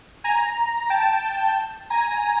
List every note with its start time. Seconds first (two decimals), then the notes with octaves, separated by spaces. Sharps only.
0.24 G#5 A#5
0.90 G5 A5
1.90 G#5 A#5